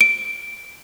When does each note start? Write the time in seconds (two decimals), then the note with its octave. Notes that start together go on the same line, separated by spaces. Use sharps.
0.01 D7